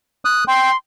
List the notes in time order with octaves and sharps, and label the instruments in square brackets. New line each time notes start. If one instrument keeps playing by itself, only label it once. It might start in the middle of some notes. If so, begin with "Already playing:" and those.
[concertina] D#6 F#6
[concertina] G5 [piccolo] C6